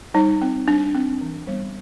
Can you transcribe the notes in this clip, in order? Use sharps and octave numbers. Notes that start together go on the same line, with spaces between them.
G3 D#4
C4
G3 D4
C4
E3
G3 B3